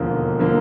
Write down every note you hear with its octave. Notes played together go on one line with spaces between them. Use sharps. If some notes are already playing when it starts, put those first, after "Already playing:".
Already playing: E1 D#2 D3 F3 A#3
D3 F3 A#3